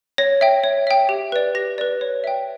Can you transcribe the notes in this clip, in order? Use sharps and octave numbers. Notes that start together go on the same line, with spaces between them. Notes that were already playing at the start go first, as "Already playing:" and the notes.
C#5 A#6
E5 G5
C#5
E5 G5
G4
B4 D5
G4 A#6
B4 D5
C#5
E5 G5